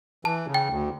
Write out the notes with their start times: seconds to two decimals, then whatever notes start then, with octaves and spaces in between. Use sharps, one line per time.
0.25 E3 A5
0.47 C#3
0.54 G5
0.70 D2